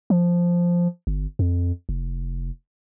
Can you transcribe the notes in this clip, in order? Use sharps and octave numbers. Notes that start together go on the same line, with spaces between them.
F3
G1
F2
F1